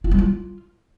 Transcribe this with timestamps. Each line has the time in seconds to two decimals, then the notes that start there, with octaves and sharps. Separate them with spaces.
0.04 F4
0.11 G3
0.19 F4